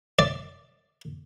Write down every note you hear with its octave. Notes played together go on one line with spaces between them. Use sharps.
D5